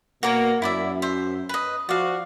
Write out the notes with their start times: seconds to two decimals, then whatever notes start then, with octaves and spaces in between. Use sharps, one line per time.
0.23 B2 A#3 F#4 A#4 C#5
0.62 F#2 E4 D5 E5
1.02 C5 E5
1.49 B4 D#5
1.89 F3 F#4 D5 F5